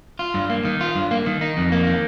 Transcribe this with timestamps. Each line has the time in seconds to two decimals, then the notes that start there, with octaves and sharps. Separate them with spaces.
0.19 F4
0.34 G2
0.50 A#3
0.65 D#3
0.81 F4
0.95 G2
1.11 A#3
1.26 D#3
1.41 D#4
1.57 F2
1.72 A#3
1.87 D#3